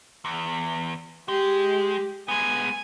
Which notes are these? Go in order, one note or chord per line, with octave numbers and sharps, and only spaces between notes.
E2
G#3 G4
G#3 B3 G#5